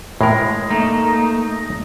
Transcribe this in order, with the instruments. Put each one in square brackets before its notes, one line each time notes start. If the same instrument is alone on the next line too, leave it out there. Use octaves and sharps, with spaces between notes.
[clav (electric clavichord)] A2 A#4 [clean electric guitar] G#3
[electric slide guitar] A3 A#3 [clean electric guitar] D#4